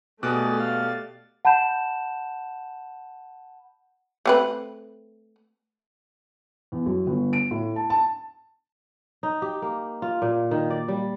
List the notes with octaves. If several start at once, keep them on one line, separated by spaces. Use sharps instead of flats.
B2 A3 G4 G#4 D5 D6 F#6 A6
F5
F#5 A5 B5 G6 E7
A3 C4 B4
E2
F#2
G1
D7
A2
A5
A5
D#4
G4
A#3
F4
A#2
D#3
D5
G3